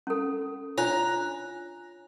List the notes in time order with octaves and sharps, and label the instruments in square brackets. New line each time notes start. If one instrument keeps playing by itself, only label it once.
[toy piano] C#4 A4
[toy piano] D4 F4 [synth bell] C#5 G#5 F#6 [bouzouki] A#5